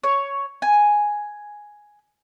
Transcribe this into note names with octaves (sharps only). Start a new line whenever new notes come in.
C#5
G#5